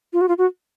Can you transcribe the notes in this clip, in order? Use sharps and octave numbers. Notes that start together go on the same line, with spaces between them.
F4
F#4
F4
F#4